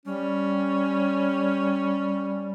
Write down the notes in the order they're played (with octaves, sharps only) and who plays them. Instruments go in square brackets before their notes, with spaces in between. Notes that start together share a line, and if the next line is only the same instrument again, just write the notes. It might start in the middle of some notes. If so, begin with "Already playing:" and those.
[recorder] G3 [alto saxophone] C#4